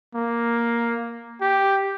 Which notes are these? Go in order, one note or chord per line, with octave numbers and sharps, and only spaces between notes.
A#3
G4